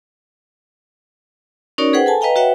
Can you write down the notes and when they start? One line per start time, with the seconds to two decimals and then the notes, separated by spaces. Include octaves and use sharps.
1.78 C#4 D#4 F#4 A#4 C#5 D5
1.93 G#4 B4 C5 F#5 G5
2.06 A4 G#5 A5
2.21 B4 D#5 F5 G5 A#5
2.36 F#4 B4 C#5 E5 F#5 G5